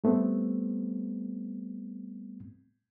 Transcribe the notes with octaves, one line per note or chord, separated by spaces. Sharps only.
G3 A3 B3 C4